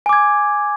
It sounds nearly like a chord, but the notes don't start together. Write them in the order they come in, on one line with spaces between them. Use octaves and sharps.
G#5 D6 G#6